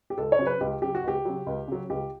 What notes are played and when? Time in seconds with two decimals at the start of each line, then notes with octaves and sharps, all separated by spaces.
0.10 G4
0.18 C#2 A4
0.32 C#5
0.39 C#3 F#3
0.47 B4
0.61 C#2 G4
0.82 C#3 F#3 G4
0.95 F#4
1.04 C#2 G4
1.25 C#3 F#3
1.46 C#2
1.68 C#3 F#3
1.90 C#2 G4